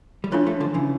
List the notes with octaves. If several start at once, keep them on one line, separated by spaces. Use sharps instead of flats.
G3
F3 A3 D4 F4 C#5
F3 A3
D3 F3
C#3 E3